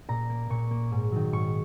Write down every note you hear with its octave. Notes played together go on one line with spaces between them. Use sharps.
A#2 A#5
A#3
A#2 C#6
A#3
G#2
D#3 F#3
G#2 C#6